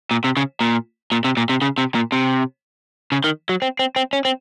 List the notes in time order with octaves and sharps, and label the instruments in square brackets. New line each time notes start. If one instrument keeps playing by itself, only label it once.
[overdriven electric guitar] A#2
C3
C#3
A#2
A#2
C3
A#2
C3
C#3
C3
A#2
C3
C#3
D#3
F#3
C4
C4
C4
C#4
C4